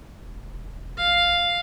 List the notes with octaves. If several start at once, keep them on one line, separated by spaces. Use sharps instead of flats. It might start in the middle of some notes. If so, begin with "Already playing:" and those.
E1
A#1 F5